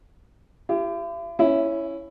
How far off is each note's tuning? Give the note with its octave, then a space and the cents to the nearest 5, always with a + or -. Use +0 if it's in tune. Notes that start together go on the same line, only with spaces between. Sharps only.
E4 +45 G4 +0
C#4 +0 E4 +5